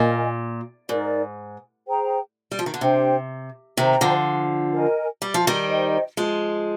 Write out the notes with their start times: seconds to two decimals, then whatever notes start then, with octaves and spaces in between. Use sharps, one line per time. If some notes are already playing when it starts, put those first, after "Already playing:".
Already playing: A#2 A#4 D#5 G#5
0.89 G#2 D#4 A#4 D5
1.86 G#4 C5 G5 A#5
2.52 G3
2.59 F3
2.66 D#3
2.74 D3
2.81 C3 D4 G4 C5 G5
3.77 C3 D#3 C5 G5 A#5
4.01 D3 F3
4.73 A#4 D#5 G#5
5.22 G3
5.34 F3
5.47 D#3 G3
5.69 C5 D#5 G5
6.17 F3 G#3